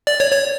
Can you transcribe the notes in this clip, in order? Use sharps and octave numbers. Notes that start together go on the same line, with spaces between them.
D5
C#5
C#5